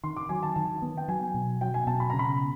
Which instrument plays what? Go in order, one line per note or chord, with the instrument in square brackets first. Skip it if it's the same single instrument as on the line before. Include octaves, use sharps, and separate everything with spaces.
[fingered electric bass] D#3 [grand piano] C6
[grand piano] D6
[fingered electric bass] F#3 [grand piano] G#5
[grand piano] A5
[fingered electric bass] D#3 [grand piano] A5
[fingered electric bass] B3
[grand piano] G5
[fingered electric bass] F#3 [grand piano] G#5
[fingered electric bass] B2
[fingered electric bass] F#3 [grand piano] G5
[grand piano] G#5
[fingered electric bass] B2 [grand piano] A5
[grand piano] B5
[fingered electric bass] C#3 [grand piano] A#5
[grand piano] B5